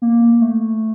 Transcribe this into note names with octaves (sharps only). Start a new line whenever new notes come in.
A#3
A#3
A3